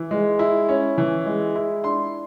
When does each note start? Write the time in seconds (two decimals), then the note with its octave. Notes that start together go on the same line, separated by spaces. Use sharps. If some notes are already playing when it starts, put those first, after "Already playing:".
Already playing: E3
0.11 G#3
0.39 E4
0.69 C#4
0.98 E3
1.26 G#3
1.55 E4
1.84 D4 C6